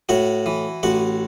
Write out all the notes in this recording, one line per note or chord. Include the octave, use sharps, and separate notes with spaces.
A2 F#4 F#5
E3
A1 F#4 F#5